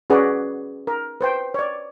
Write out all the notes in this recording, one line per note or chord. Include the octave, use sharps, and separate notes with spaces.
C#4 F#4 G#4 B4 D5
A#4
B4 C5 G5
C#5 D5